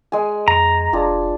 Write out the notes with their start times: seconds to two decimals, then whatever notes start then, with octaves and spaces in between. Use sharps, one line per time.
0.12 G#3 G#5
0.48 F2 A#5
0.93 F1 D4 F4 G#4